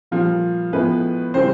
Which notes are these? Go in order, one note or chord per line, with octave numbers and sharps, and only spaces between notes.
A#2 F3 G3 F4
A2 F3 G#3 B3 B4
C#3 E3 G3 C4 C5